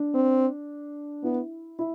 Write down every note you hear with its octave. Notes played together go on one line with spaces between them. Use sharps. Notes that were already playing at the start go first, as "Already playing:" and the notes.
Already playing: D4
C4
B3 E4
E4